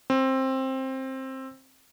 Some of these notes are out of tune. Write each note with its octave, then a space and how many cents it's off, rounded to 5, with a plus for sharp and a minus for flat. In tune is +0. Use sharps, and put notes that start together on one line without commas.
C4 +15